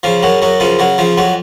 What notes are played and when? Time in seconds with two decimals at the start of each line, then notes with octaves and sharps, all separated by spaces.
0.03 C#3 F3
0.23 F#2 F#3
0.42 F#2 F#3
0.60 C#3 F3
0.79 C#3 F#3
0.98 C#3 F3
1.18 F2 F#3